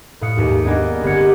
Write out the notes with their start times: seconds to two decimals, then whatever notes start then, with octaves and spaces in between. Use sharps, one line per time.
0.21 A2 B4 F5 D#6 C#7
0.37 D#2 G#2
0.64 A#3 B3 D4 G#4 D#5
1.03 G1 C4 A#4 F#6 G#6 C#7